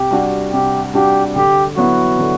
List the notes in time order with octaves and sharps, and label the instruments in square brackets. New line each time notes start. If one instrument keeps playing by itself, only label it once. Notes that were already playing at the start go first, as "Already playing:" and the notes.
Already playing: [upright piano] C3 [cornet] G4
[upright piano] G3 D4 F#4
[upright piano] C3 [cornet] G4
[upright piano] G3 D4 F#4 [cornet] G4
[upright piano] D3 [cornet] G4
[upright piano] F#3 B3 E4 [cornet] F#4
[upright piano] D3